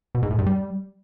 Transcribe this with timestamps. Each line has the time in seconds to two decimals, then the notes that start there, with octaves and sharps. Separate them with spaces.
0.15 B2
0.23 G#2
0.31 A2
0.39 G2
0.47 G3